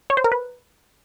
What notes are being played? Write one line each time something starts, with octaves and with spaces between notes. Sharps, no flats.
C#5
C5
A#4
B4